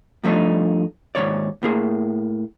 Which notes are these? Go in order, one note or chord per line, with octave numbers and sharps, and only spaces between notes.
G2 F3 A3 B3 D4 D#4
D#2 G#2 C#3 C#5 D5
A2 A#3 G#4